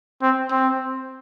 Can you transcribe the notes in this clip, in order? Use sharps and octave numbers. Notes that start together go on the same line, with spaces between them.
C4
C4